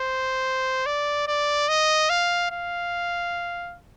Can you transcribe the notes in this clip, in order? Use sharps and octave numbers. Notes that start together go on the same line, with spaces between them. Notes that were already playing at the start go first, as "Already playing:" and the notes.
Already playing: C5
D5
D5
D#5
F5
F5